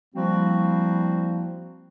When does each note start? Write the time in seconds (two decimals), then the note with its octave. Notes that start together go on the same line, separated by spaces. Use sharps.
0.15 F3 G3 A#3 C4 E4 F#4